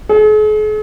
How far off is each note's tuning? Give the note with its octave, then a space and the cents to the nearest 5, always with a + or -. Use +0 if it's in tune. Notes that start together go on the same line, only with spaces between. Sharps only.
G#4 +45